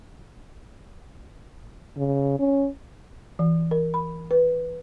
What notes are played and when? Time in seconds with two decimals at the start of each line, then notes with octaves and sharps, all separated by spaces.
1.97 C#3
2.39 C#4
3.39 E3
3.71 A#4
3.94 B5
4.31 B4